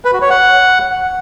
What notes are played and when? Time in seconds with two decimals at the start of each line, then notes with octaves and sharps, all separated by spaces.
0.05 B4
0.13 F#4
0.22 C#5
0.30 F#5